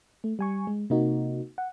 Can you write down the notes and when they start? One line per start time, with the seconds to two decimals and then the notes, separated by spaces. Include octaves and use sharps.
0.24 A3
0.39 G3 G#5 C#6
0.67 G#3
0.90 C3 A#3 D#4 F#4
1.58 F#5